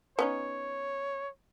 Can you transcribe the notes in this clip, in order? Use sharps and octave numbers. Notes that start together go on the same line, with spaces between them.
B3 C#4 D#4 C#5